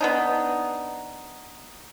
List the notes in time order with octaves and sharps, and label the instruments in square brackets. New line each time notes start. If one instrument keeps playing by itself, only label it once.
[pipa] B3 D4 D#4